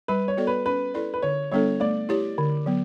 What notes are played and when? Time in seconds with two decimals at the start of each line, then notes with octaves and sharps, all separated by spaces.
0.08 G3 B4
0.28 C#5
0.37 B3 F#4 A4 D5
0.47 B4
0.65 C#4 B4
0.94 E4 A4 B4 D5
1.14 B4
1.22 D3 C#5
1.51 G3 B3 D4 A4 C#5
1.80 A3 D5
2.09 E4 G4 C#5
2.38 D3
2.66 F#3 B3